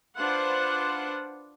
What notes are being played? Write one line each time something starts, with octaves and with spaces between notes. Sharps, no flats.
D4 F4 B4 C5 F#5